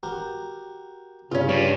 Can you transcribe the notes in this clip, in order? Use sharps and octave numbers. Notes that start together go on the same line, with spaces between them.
F#4 G4 A#4
G2 C#3 C#4 F4
G3 D4 C#5